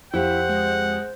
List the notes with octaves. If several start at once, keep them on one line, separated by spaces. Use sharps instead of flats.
F2 A3 E4 G4 C5 F#5
G#3